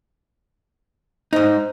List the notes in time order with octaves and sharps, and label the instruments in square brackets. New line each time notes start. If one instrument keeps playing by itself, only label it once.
[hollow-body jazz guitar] G#2 D#4 [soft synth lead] C5